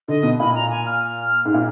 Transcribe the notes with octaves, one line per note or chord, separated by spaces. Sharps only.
D3 D#5
B2
A#2 B5
A#5
G#5
F6
G#2
A#2